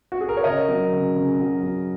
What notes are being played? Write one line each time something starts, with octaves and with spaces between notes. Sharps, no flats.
F#4
G#4
A#4
C#5
C#3 A#4 D#5
F#3
C#3
C#3
F#3
F#3